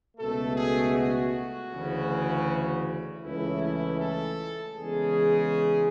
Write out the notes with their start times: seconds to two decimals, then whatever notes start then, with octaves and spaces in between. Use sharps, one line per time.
0.17 C#2 B2 A3 A4
0.56 G#4
0.94 F#4
1.71 D2 C#3 E3
3.23 C#2 C#3 E3 A3 E4
3.62 E4
4.00 A4
4.76 E2 C#3 G#3 G#4